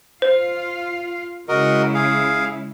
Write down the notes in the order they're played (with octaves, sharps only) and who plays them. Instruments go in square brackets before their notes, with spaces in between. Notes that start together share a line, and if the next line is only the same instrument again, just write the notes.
[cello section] F4 F5 [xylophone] C5
[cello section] C#3 G#3 E4 [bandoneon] F#4 A#4 D#5
[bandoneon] G#4 F5